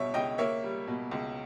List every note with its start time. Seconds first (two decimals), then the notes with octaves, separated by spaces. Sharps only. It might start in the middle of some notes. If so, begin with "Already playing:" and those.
Already playing: C#2 B2 G3 C#5 E5
0.14 C#2 D#5 G5
0.38 A#3 C#5 E5
0.63 G3
0.87 B2
1.11 C#2